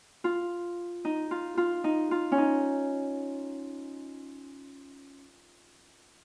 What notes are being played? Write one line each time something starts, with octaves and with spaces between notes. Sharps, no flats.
F4
D#4
F4
F4
D#4
F4
C#4
D#4